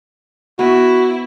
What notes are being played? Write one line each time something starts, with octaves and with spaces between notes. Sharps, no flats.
B3 E4 F#4